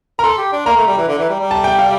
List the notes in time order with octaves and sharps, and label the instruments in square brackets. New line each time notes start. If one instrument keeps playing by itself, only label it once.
[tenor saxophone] A#4 [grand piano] A#5
[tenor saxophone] A4 [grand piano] C6
[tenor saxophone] G4
D4
[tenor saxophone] A#3 [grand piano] A#5
[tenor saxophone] A3
G3
E3
D3
E3
G3
G3
[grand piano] A5
G5
F5